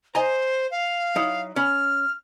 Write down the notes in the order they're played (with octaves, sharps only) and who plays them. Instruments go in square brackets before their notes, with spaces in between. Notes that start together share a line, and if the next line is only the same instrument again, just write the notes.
[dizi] C5 [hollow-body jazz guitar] D#5 G#5 A#5
[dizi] F5
[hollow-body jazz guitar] F#3 D#4 E4
[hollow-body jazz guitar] C#4 B5 [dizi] F6